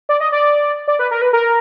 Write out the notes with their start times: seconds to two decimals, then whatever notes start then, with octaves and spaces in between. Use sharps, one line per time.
0.09 D5
0.20 D#5
0.32 D5
0.88 D5
0.99 B4
1.11 A#4
1.22 B4
1.33 A#4